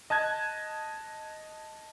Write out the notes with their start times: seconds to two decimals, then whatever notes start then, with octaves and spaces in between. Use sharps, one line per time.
0.10 D#5 A5 F#6 G#6